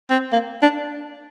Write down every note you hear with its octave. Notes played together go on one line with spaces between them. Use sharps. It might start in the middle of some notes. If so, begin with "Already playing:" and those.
C4
A#3
D4